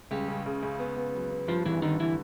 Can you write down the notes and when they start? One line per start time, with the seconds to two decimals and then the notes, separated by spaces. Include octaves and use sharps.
0.11 C#2 G3 G4
0.28 C#3
0.46 C#3
0.63 C#2
0.79 B3
0.96 B3
1.14 F#3
1.31 B3
1.48 G2 F3 F4
1.66 G#1 E3 E4
1.82 D3 D#3 D#4
2.00 E3 E4